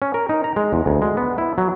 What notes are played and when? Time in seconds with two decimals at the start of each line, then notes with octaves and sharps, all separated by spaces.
0.02 C#4
0.14 A#4
0.29 D#4
0.44 A#5
0.56 G#3
0.73 E2
0.86 D2
1.02 G#3
1.17 B3
1.38 E4
1.58 F#3